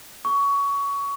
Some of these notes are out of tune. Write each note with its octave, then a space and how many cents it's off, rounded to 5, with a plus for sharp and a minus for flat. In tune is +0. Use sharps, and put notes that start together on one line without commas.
C#6 +20